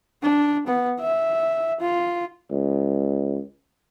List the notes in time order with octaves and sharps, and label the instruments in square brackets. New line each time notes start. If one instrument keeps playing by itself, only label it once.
[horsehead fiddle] D4
B3
E5
F4
[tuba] C#2